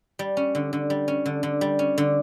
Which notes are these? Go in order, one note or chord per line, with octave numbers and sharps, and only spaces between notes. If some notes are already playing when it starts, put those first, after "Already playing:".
G3
C#4
D3
D3
G3
C#4
D3
D3
G3
C#4
D3